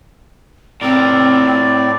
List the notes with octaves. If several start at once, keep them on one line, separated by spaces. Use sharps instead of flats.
A2 C4 A#4 D5